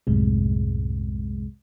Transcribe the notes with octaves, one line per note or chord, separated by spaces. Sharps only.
C2 F#2 A2 C3 G#3